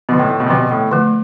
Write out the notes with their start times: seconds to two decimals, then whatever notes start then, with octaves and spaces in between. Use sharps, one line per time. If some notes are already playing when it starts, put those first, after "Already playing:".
0.09 B2 D3 F3 B3
0.19 A2
0.29 A2
0.40 B2
0.46 C3
0.50 B2 D3 F3 B3
0.71 A2
0.91 D3 F3 A3